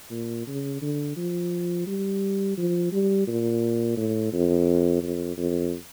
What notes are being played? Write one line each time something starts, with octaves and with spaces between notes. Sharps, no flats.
A#2
C#3
D3
F3
G3
F3
G3
A#2
A2
F2
F2
F2